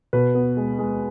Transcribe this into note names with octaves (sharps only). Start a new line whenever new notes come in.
B2 B4
B3
G#3
G#3